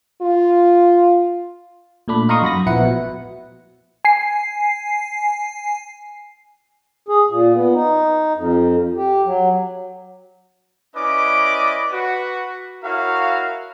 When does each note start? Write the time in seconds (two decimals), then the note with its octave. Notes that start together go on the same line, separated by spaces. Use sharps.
0.22 F4
2.08 A#2 A3 D4 B5
2.29 D#4 F5 A#5 C6 C#6 D#6
2.42 F#2 F#4 B5 A#6
2.67 A#1 F3 B3 E4 F#5 C#7
2.85 B2
4.05 G#5 C7
7.09 G#4
7.30 A#2
7.55 B3
7.74 D#4
8.37 F2
8.97 G4
9.26 F#3
10.96 C#4 E4 B4 D5 D#5 D6
11.92 F#4 B4
12.83 E4 F#4 A#4 C#5 F5